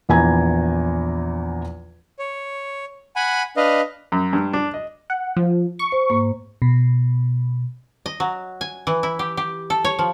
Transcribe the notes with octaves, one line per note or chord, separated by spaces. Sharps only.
A#1 E2 E3 G#5 A#5 G#6
C#5
F#5 G#5 B5
D4 B4 D#5 F5
F#2
G2
D4
D#5
F#5
F3
C#6
C5
G#2 A#3
B2
D#5
F#3
G#5
E3
E4
G4
G4
A4
C#5
F3